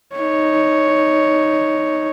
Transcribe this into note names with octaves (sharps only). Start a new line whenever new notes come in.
D#4 C#5